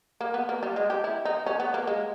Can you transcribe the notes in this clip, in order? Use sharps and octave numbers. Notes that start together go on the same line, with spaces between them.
A#3
B3
A#3
G3
G#3
G4
E4
D#4
C#4
B3
A#3
G#3